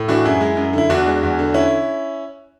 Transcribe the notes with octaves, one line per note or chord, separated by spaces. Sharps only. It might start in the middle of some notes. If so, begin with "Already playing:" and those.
Already playing: A2
E3 D4 F#4
F#2 E4 G#4
G#3
F#2
D3 E4
E2 D4 F#4
G#3
E2
D3
C#4 E4